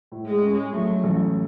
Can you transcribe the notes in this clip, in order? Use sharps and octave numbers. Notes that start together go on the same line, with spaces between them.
A2
G#3
C#4
F#3 A3
A1